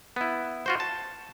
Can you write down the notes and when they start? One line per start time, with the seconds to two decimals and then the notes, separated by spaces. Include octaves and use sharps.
0.16 B3 E4
0.66 F4 F#4 C5
0.80 A5